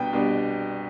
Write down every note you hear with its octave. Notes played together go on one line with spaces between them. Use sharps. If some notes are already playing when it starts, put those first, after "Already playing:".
Already playing: C2 B2 B3 D4 G5
C2 B2 B3 D4